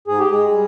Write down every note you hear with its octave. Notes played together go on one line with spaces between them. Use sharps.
G#2 G#4
G4
G#3 G#4
G3